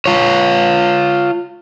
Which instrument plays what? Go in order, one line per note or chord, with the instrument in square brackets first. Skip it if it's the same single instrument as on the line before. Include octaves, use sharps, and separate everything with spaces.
[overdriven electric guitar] F4 C#5